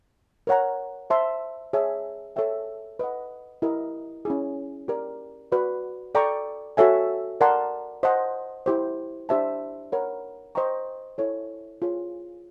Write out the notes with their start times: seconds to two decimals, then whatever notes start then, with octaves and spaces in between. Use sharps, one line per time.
0.47 A#4 C#5 F#5 A#5
1.10 C5 E5 A5 C6
1.73 G#4 C#5 E5 A5
2.36 A4 C#5 E5 G5
2.99 B4 D#5 F#5
3.62 E4 G4 A#4 D#5
4.25 C#4 E4 G#4
4.88 G4 A#4 D5
5.52 F#4 B4 D5
6.15 A4 D5 G5 A#5 C#6
6.77 F#4 A4 C#5 E5 G#5
7.41 A#4 D5 F#5 A5 C6
8.03 C5 D#5 F#5 A5 C6
8.66 E4 G4 C5
9.29 D4 G4 C5 E5 A5
9.92 A#4 C#5 F#5 B5
10.55 C5 D#5 G5 A#5 C#6
11.18 E4 A4 C#5
11.82 F4 G#4 C#5